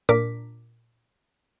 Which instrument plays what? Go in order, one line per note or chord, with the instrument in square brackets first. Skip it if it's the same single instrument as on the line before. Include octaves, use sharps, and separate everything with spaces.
[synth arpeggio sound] A#2 D4 A#4 D6 B6